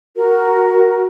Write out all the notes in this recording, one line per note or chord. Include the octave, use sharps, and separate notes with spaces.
F#4 A#4